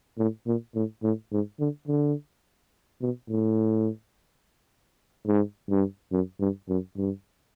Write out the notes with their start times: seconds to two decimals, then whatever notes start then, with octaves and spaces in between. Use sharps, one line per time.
0.18 A2
0.47 A#2
0.75 A2
1.03 A2
1.32 G#2
1.60 D3
1.88 D3
3.01 B2
3.29 A2
5.27 G#2
5.70 G2
6.12 F#2
6.40 G2
6.69 F#2
6.97 G2